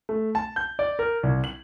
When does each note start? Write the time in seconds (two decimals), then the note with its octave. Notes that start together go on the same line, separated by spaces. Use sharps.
0.09 A3
0.35 A5
0.56 G6
0.79 D5
0.99 A#4
1.23 C2
1.44 F#7